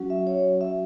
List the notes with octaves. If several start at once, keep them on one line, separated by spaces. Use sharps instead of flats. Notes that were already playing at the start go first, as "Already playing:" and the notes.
Already playing: F#3 C#4 F#4
E5
C#5
E5